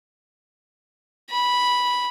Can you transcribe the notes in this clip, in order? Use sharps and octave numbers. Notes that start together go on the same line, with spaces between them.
B5